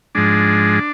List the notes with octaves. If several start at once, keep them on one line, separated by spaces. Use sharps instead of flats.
G#2 F3 G#3 D4